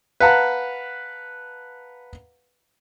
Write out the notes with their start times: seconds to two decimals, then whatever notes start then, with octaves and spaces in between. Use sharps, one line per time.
0.20 B4 F5 F#5 A5 A#5